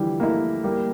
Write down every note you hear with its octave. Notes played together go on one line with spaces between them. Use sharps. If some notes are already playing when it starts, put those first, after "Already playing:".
Already playing: D3 E3 F3 G3 E4
A3 A#3 E4
G3 A#3